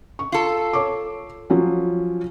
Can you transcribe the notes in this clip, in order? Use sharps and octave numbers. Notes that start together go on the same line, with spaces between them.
C#6
F4 A4
C#5 C#6 D6
F3 F#3 C#4